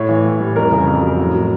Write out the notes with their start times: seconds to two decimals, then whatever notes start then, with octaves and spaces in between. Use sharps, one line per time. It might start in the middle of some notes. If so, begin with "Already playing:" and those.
Already playing: A2 C#5
0.09 E3
0.25 A2
0.40 G3
0.56 F2 A#4
0.72 C#3
0.87 F2
1.02 F#3
1.19 A2
1.34 F#3